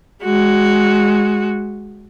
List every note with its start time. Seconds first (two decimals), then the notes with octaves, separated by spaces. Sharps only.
0.23 G#3 F#4